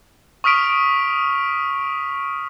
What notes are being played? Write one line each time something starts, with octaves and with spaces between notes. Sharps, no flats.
C#6 D#6 F6 B6 D7 F7